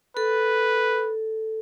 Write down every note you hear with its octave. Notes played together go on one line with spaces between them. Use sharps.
A4 B4